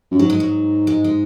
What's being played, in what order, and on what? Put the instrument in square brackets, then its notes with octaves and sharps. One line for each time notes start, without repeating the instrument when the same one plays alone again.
[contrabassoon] F#2
[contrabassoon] G#2 [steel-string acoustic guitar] F#3
[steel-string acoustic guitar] G#3
F#3
G#3
G#3